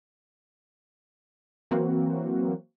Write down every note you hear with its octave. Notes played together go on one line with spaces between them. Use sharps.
E3 F#3 A#3 C4 F#4